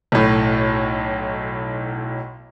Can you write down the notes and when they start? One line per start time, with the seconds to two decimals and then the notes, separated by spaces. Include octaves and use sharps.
0.12 B1 A2